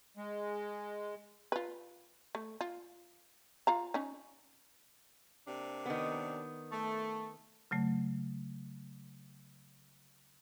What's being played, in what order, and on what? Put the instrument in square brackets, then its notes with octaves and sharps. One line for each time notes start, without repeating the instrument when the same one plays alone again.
[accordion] G#3
[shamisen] F4 B4
A3
F4
F4 F5 A#5
C#4 D#4
[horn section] C3 A#3 D4
[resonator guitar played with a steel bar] D#3 B3
[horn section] A3
[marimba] C#3 F#3 A3